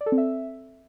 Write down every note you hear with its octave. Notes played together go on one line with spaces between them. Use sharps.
D5
A4
C4
E5